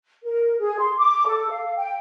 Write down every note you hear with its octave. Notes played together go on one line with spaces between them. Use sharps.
A#4
G#4
C6
D6
A4
F5
G5